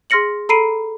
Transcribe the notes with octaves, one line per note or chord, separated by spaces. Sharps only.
G#4 C6 F6 A#6 C#7 F#7
A4 A#5 B5 C7 D7 D#7